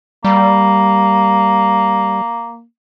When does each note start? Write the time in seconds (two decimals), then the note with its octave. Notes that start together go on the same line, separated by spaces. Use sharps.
0.25 G3 A#3